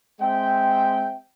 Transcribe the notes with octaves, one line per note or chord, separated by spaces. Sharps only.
G#3 C4 E5 G5